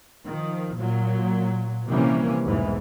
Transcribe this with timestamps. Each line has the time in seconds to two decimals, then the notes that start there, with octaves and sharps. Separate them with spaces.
0.24 D#3 F3
0.76 A#2 F#3
1.87 C3 E3 F3 G3 A#3 C#4
2.44 B1 E2 G#2 E3